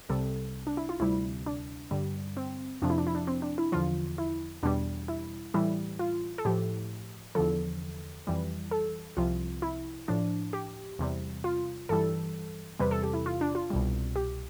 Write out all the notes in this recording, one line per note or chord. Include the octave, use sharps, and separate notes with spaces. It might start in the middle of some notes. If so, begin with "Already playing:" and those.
C2 C3 G3 A4
D4
E4
F4
D2 C3 G3 E4
D4
G2 D3 G3
C4
F2 C3 F3 D4
E4
D4
E4
D4
C4
D4
E4
E2 D3 F3 F4
E4
E2 B2 G3 D4
E4
A2 E3 G3 E4
F4
A4
A2 F3 G4
E2 D3 F3 A4
F2 E3 G3
A4
C2 C3 F3 F4
E4
A2 F3 D4
G4
E2 C3 G3
F4
G2 E3 G3 A4
E2 C3 G3 B4
A4
G4
E4
F4
D4
F4
C2 B2 G3
G4